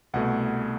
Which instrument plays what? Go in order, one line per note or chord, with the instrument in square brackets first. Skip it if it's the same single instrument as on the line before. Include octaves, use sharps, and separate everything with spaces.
[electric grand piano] C2 B2 A3 F#5